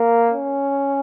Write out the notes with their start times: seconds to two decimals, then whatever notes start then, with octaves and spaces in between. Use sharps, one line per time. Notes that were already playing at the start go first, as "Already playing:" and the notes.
Already playing: A#3
0.30 C#4